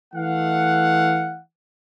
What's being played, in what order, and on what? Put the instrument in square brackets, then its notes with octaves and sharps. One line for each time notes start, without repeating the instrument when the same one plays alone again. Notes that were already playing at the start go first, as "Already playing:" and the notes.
[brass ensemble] E3 A3 F5 F#5